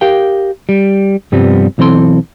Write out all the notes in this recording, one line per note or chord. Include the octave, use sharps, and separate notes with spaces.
G4 A#4 F5 G5
G3
G2 C3 F3 G3 B3 C4
B1 E3 C4 A4 C6